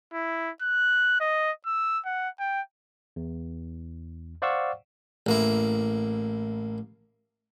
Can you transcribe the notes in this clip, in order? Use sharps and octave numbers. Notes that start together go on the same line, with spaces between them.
E4
F#6
D#5
E6
F#5
G5
E2
C5 D5 F5 F#5 C#6 E6
A1 A#3 E4